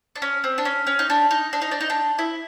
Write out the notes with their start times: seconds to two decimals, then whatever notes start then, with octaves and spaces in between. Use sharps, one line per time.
0.16 D4
0.22 C#4
0.44 C4
0.58 D4
0.65 C#4
0.87 C#4
0.99 D#4
1.10 D4
1.31 D#4
1.53 D4
1.62 D#4
1.71 D4
1.81 D#4
1.90 D4
2.19 E4